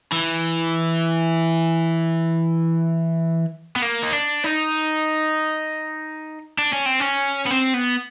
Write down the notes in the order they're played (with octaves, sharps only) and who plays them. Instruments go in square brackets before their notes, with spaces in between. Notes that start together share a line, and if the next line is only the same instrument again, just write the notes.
[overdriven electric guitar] E3
B3
A#3
D#4
D4
D#4
D4
C#4
C4
C#4
B3
C4
B3